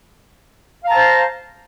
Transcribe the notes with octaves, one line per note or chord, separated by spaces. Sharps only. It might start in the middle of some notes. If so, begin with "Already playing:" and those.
C5 F5 A5 A#5